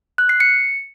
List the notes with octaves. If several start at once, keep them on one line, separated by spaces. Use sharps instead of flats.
F#6
C7
C#7